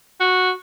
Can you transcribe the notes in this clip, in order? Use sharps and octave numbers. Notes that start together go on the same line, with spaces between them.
F#4